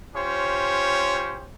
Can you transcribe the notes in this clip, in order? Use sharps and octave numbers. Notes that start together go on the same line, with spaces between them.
C#4 F4 G4 C5 C#5